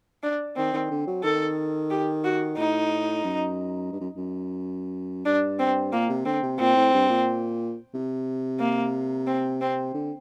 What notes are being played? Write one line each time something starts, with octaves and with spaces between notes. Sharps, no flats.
D4
D#3 C4
D#3
D3
F#3
D#3 A4
G4
F#4
A2 D#4
F#2
G2
F#2
F#2
G2 D4
C4
A#2 A#3
C3
D3 C4
C3
A#2 C4
A2
G2
A#2
C3
A#3
C4
C4
D3